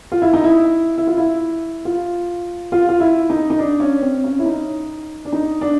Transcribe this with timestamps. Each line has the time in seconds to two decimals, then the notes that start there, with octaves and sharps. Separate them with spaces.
0.12 F4
0.22 E4
0.33 D#4
0.44 E4
0.98 E4
1.07 F4
1.17 E4
1.85 F4
2.72 F4
2.89 F4
3.00 E4
3.30 D#4
3.50 D#4
3.59 D4
3.80 C#4
4.02 C4
4.24 C#4
4.39 E4
4.45 D#4
5.25 D4
5.33 D#4
5.61 D4